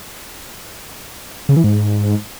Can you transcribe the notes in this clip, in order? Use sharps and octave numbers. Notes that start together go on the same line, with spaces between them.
C#3
E3
G#2